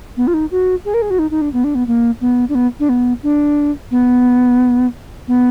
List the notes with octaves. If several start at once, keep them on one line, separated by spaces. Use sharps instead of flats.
B3
F4
D#4
F#4
G#4
A#4
G#4
F#4
D#4
D#4
D4
B3
D4
B3
A#3
B3
D4
B3
D4
B3
D4
B3
B3